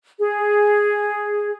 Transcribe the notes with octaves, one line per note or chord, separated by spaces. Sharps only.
G#4